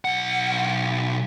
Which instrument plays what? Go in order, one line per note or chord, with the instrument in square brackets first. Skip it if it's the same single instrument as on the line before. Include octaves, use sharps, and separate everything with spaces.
[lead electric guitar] B1 F#5